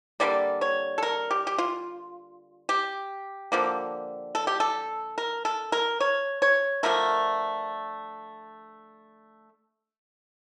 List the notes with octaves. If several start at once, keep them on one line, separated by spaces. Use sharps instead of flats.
D3 G3 A#3 D5
C#5
A4
A#4
G4
G4
F4
G4
D3 F3 A#3
A4
G4
A4
A#4
A4
A#4
C#5
C#5
D3 F3 A3 A#4